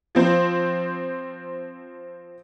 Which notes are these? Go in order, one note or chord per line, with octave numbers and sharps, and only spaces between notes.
F3 C4 C5